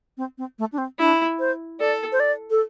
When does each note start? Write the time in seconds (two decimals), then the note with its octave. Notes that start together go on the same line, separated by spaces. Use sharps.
0.17 C4
0.38 C4
0.59 A3
0.72 D4
0.78 C4
0.99 D4 E4
1.39 C5
1.80 A4 D5
2.12 C5
2.20 D5
2.50 A4